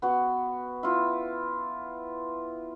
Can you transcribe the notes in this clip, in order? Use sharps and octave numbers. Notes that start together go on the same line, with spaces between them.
B3 F#4
E4 F4